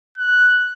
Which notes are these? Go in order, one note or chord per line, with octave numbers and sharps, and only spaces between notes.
F#6